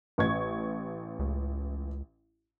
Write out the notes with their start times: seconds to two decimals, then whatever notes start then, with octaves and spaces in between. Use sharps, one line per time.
0.18 A1 C#6 G#6
1.19 C#2